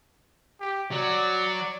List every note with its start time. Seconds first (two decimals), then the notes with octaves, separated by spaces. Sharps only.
0.61 G4
0.92 F#3 F#4 D5